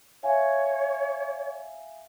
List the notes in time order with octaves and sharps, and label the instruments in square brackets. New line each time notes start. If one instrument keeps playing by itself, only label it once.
[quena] C#5 [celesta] E5 F5 G#5